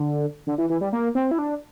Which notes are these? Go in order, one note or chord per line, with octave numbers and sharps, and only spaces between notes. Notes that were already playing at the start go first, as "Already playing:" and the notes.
Already playing: D3
D3
E3
E3
G3
A#3
C4
E4
D4